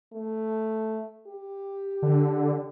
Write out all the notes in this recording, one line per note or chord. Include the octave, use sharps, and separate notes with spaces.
A3
G4
D3